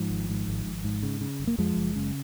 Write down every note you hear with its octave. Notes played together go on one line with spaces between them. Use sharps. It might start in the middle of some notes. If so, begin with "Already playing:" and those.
Already playing: G#2 F3
G#1
G#2
G#1
G#1
G#2
C#3
C#3
F#1
A#3
F2 F3 G#3
F#1
C#3